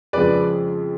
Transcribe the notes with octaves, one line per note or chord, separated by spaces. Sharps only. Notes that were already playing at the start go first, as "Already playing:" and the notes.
F2 C#3 F3 G#3 B4 D5